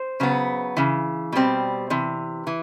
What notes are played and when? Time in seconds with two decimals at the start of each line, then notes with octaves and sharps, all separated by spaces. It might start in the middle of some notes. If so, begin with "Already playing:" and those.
Already playing: C5
0.20 C#3 F#3 B3
0.77 C#3 E3
1.32 B2 G3 C4
1.90 C3 E3
2.47 E3